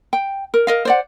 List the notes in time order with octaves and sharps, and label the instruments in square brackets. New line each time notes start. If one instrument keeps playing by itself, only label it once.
[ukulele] G5
A#4
A#4 D#5 F5
C5 D5 F#5